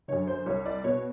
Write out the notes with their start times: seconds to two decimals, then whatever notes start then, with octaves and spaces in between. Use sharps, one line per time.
0.08 F#2 D3 C#5
0.27 C5
0.46 C2 C#5
0.66 D5
0.84 B2 C#5